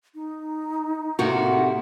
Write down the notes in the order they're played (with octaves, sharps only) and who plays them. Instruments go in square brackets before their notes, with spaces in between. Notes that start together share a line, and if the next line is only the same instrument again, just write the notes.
[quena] D#4
[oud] A2 C3 A#3 [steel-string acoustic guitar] F#4